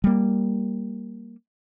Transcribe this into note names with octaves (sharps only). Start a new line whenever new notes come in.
G3 A#3